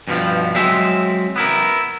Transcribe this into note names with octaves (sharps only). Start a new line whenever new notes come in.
G2 B2 D3 F3
F#3 G#3 C4 E5
B3 E4 A#4